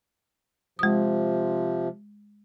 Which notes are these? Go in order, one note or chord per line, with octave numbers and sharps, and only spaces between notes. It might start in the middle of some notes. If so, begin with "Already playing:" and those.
C3 F3 G#3 D#6